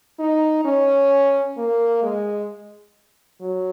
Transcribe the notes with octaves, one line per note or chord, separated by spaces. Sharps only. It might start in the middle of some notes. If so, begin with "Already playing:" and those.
D#4
C#4
A#3
G#3
F#3